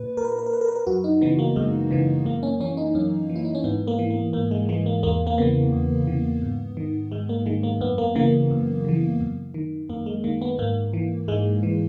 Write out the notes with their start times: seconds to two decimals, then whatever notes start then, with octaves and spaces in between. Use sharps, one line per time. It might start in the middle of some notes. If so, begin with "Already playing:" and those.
Already playing: A#2 B4
0.17 A#2 A#4
0.25 B4
0.32 A#4
0.39 B4
0.46 A#4
0.53 B4
0.61 A#4
0.68 B4
0.76 A#4
0.87 F#2 F#4
1.04 D#4
1.21 C#3 E3 B3
1.39 A#3
1.56 F#2 G#3
1.91 C#3 E3
2.25 F#2 A#3
2.43 C#4
2.60 E3 C#4
2.77 D#4
2.95 F#2 C#4
3.29 E3
3.36 E4
3.45 D#4
3.55 C#4
3.64 G#2 B3
3.87 A#3
3.99 E3
4.10 A#3
4.33 G#2 A#3
4.51 G#3
4.69 E3 G#3
4.86 A#3
5.03 E2 A#3
5.27 A#3
5.38 C#3 E3 B3
5.72 E2
6.07 C#3 E3
6.42 G#2
6.77 D#3
7.12 G#2 G#3
7.29 A#3
7.46 D#3 G#3
7.63 A#3
7.81 F#2 B3
7.98 A#3
8.15 C#3 E3 A#3
8.51 F#2
8.85 C#3 E3
9.20 F#2
9.54 D#3
9.89 F#2 A#3
10.06 G#3
10.24 D#3 A#3
10.42 B3
10.59 G#2 A#3
10.93 E3
11.28 G#2 G#3
11.63 E3